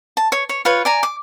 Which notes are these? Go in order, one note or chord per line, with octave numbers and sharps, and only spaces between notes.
A5
C#5
C#5
F4 B4 C#5
D5 G#5 A#5
D6